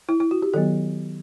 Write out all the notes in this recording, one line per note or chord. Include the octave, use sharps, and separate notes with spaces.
E4
E4
F#4
G4
D#3 F#3 B3 A4